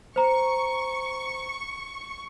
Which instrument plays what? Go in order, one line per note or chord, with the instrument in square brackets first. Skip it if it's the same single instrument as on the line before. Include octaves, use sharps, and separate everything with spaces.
[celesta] C5 A#5 [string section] C#6